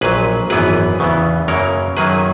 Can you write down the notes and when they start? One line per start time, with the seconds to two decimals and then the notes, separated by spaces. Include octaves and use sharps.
0.01 A#1 A#2 F#3 G#4 B4
0.50 G#1 F#2 E3 B3 G#4 B4
1.00 E2 C#3 E3 B3
1.48 F#2 C#3 F#3 A#3 A#4 C#5
1.97 F#2 D#3 F#3 A#3 G#4 B4